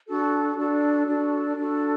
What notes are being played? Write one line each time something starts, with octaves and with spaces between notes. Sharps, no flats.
D4 F#4 A4
D4 F#4 A4
D4 F#4 A4
D4 F#4 A4